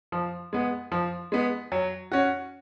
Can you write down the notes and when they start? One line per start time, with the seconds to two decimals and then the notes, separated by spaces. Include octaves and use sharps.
0.12 F3
0.53 G#3 B3
0.92 F3
1.32 G#3 B3
1.72 F#3
2.12 C#4 F#4